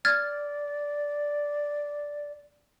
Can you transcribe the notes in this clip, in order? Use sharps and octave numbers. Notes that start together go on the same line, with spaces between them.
D5 F6 G#6 A6